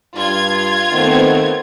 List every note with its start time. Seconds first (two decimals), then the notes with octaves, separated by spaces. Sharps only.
0.16 G2 F4 G#6
0.92 D#3 A3 B3 C4